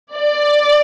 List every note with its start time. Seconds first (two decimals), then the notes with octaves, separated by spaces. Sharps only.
0.14 D5